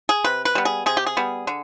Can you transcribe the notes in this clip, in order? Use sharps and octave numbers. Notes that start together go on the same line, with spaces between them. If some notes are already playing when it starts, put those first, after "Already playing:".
G#4
C3 B4
B4
G3 B3
G#4
C3 G#4
G4
G#4
G3 B3
D3